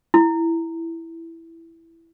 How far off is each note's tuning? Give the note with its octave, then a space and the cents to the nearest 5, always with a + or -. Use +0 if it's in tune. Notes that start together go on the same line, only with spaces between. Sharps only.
E4 +5